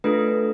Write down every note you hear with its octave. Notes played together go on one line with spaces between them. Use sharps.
A3 D4 F4 A4 B4